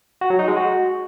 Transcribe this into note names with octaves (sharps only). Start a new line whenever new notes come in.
F#4
F#3
D#4
G#3
F#4